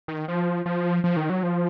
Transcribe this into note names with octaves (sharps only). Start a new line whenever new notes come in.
D#3
F3
F3
F3
D#3
F#3
F3